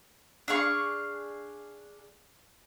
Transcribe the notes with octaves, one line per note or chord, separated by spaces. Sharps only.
D4 G#4 F5 C#6